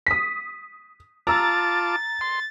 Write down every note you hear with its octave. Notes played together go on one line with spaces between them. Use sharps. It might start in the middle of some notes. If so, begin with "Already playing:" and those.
D#6 B6
F4 A5 A#5 D6 E6 A6
C6